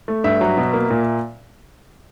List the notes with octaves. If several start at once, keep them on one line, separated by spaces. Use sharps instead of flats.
A3
G2 E5
F#3
B2
A#3
A#2